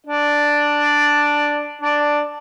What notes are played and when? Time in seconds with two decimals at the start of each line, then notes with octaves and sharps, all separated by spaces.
0.06 D4 D5
1.81 D4 D5